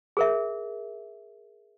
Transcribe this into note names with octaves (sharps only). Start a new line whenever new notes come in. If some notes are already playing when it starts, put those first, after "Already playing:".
G#4 A#4 E5